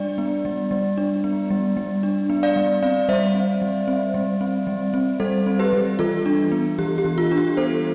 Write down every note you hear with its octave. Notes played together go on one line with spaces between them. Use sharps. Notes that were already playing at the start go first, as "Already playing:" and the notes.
Already playing: G3 D4 D5
B3
G3
G3
D4
B3
G3
G3
D4
B3
D5 F5
G3
C4 D5 F5
G3 C5 E5
C4
G3
C4
G3
C4
G3
C4
G3 A4 C5
C4
G4 B4
G3
E3 F4 A4
D4
B3
E3 G4
G4
E3
F4
D4
G4
B3 A4 C5